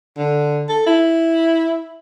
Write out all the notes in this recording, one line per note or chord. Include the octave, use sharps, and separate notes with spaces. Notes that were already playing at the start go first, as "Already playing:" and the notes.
D3
A4
E4